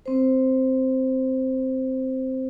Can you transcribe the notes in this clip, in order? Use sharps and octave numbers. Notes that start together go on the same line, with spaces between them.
C4 C5